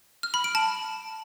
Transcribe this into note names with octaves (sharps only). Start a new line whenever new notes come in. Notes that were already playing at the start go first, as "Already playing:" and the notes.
F6
B5
D7
A5